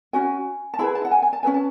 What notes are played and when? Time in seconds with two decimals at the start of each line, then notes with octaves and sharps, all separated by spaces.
0.13 C#4 F#4 G#5
0.74 A5
0.79 E4 G#4 B4 B5
0.95 A5
1.05 F#5
1.11 G#5
1.22 G#5
1.33 A5
1.43 C#4 G#4 B4 G#5
1.54 A5